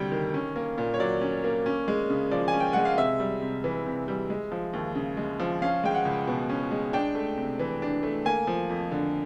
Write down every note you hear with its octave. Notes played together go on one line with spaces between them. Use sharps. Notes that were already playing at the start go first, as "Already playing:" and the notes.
Already playing: D2 C3 G3 G5
D#3
C#4
A#3
A#2
C#5
F#3 D5
C#4
A#3
C#4
G#3
C#3
F3 D5
G#5
C#4
G5
G#3 F#5
F5
C3 E5
G3
C3
E3
C3
G3
G#3
F3
D#2
C#3
G#3
F3
C#4 F5
G#3 G5
F#5
C#2
B2
C#4
G#3
D4 G5
A3
C3
E3
D4
A3
A#3 G#5
F3
F2
D3